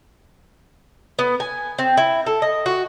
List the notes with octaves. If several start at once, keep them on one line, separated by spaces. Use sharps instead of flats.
B3
G#5
C4
E4
A4
D#5
F#4